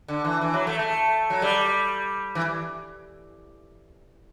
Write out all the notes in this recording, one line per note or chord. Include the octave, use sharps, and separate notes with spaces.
D3
E3
E3
F#3
A3
A3
F#3
G3
E3